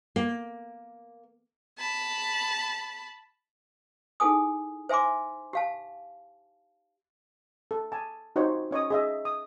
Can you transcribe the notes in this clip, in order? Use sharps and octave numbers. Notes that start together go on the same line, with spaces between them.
A#3
A5 B5
D#4 E4 G#4 A4 G#5 D#6
C5 E5 G#5 C6 D6
G4 F5 A5
A4
G#5 A5
D#4 F#4 C5 C#5
C#4 C#5 D#5 D#6
G#4 D#5 E5
D#6